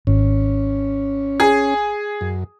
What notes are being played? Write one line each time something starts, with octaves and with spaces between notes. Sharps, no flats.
G#1 C#4
G#4
F#2